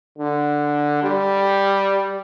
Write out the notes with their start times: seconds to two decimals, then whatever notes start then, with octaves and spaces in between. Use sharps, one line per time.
0.18 D3
1.03 G3